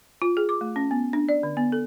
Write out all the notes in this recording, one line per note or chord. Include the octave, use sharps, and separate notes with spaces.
F4
G#4
D6
A3
C#4
B3
D4
D5
D3
B3
A4